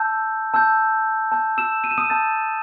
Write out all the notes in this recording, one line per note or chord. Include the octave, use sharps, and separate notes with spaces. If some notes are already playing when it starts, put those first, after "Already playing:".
Already playing: A5 E6 G6
A5 E6 G6
A5 E6 G6
E6 E7
D#7
E7
D#6 D#7
A5 E6 G6 A6